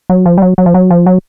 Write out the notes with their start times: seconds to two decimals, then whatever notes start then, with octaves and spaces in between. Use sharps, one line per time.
0.10 F#3
0.26 F3
0.38 G3
0.42 F#3
0.58 F#3
0.66 F3
0.74 F#3
0.90 F3
1.06 F#3